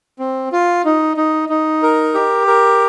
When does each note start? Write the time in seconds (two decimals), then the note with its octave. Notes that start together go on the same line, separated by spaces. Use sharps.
0.19 C4
0.52 F4
0.85 D#4
1.17 D#4
1.49 D#4
1.83 A#4
2.14 G4
2.47 A#4